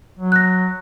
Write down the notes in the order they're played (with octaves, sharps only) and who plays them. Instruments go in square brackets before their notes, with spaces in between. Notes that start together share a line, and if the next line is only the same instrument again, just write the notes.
[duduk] F#3
[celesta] F#6 A#6